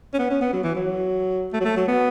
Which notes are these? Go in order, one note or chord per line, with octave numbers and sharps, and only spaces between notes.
C#4
B3
C#4
B3
F#3
E3
F#3
A3
F#3
A3
F#3
B3